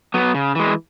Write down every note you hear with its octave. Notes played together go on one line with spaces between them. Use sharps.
F#3 B3
C#3
E3 G#3